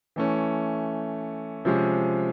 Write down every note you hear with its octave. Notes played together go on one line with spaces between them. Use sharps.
E3 A3 C#4
C3 F3 G#3 C#4